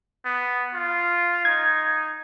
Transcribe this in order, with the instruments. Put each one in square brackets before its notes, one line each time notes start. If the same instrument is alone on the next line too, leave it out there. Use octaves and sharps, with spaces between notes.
[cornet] B3
F4
[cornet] D#4 [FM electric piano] G#6